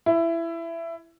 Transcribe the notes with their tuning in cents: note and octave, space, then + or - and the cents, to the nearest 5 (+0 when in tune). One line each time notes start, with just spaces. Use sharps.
E4 +15